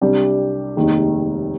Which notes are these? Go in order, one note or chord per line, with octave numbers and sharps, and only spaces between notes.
C2 C3 G3 D4 G4
F1 D#2 D#3 G#3